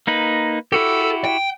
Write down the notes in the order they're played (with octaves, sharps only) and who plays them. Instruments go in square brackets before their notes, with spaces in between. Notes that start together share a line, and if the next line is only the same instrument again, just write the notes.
[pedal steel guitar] A#3 D#4 B4
[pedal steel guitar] E4 F#4 G4 [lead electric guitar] A4
[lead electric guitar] G5